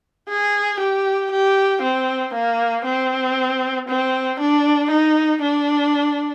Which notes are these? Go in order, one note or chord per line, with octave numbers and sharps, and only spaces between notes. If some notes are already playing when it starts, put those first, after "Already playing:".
G#4
G4
G4
C4
A#3
C4
C4
D4
D#4
D4